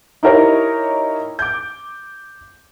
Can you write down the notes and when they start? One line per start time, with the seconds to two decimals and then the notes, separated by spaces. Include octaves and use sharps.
0.23 D#4 E4 G4 A#4 C#5 D#5
1.39 D6 G6